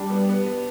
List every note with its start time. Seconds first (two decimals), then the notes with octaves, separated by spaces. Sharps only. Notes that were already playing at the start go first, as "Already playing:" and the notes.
Already playing: G3 D4
0.10 B3
0.29 B3
0.47 B3